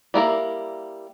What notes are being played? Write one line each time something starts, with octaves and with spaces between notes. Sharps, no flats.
G3 A#3 E4 A#4